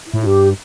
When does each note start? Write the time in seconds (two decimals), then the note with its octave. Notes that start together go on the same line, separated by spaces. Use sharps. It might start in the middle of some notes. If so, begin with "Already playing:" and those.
0.08 E4
0.14 A2
0.25 G2 G4